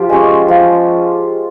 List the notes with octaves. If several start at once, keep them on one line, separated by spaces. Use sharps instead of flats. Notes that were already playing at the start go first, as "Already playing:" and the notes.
Already playing: F3 F4 G4
G#3 C#4
F3